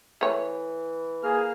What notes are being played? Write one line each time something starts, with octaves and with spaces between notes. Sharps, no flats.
E3 A3 C#5
A#3 G#4 F6